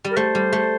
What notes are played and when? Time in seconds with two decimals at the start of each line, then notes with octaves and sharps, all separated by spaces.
0.04 G3
0.11 A#4
0.16 A3 C5
0.35 G3
0.53 A3